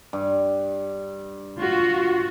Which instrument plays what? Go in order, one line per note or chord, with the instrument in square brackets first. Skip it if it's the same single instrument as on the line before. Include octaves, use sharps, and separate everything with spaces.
[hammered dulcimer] G2
[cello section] F4 F#4